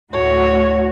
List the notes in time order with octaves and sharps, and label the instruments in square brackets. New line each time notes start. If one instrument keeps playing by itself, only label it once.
[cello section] D2 A2 F#4 [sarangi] C#5